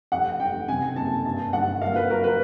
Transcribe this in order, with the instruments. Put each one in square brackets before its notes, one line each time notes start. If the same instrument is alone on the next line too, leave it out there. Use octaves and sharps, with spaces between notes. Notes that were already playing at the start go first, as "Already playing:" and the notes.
[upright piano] F1 F#5
F1 G5
C3 G#5
F#1 A5
G2 A5
G1 F#5
A#3 F5
B4
F#3 A#4
B4